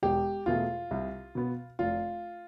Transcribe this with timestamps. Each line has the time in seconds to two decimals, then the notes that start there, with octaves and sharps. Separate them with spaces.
0.03 E1 G4
0.46 E2 B2 A3 F4
0.91 C2
1.35 B2 B3
1.79 F1 F4